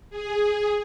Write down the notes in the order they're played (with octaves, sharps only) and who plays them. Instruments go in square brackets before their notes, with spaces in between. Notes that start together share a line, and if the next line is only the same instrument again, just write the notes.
[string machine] G#4